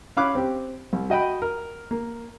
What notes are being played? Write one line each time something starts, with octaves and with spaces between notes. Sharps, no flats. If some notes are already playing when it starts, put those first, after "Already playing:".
C#4 F5 B5 D6 F#6
C4 G4
C2
F#4 D#5 G5 B5
A#4
A#3